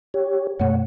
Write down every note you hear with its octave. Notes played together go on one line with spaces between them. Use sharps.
G4 C#5
F#2 B2 A3 C#5 F#5